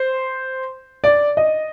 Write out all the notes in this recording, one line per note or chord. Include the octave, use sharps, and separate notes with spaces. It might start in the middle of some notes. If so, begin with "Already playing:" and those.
Already playing: C5
D5
D#5